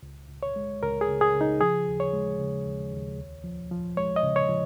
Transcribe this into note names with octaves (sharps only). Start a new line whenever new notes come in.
C#2
C#2
C#5
G#3
C#2 A#4
G#4
C#3
G#4
C#3
D#4
F3 G#4
D#2
C#5
G#3
C#3
D#2
D#2
C#2
F3
F3
G#3 C#5
D#5
C#3
C#5
F3